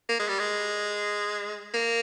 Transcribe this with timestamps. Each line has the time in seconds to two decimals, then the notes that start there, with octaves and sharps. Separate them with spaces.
0.09 A#3
0.19 G#3
0.29 G3
0.39 G#3
1.74 A#3